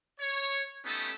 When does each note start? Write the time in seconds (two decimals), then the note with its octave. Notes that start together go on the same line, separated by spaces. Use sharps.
0.20 C#5
0.85 A3 B3 C#4 D#4 G4 A4